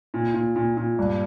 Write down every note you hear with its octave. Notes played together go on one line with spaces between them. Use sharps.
A#2
A#2
A#2
A#2
G2